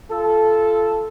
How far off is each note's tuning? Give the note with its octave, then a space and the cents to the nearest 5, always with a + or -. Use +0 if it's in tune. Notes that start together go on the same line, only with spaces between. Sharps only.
F4 -25 A4 -10